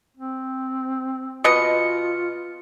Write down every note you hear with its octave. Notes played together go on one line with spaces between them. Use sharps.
C4
B2 F4 D#5 C#7